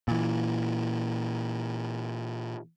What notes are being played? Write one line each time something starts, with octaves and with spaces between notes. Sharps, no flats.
A#2 E3